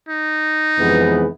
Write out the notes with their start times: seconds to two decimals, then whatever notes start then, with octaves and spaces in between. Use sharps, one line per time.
0.09 D#4
0.78 F2 C3 E3 G#3 B3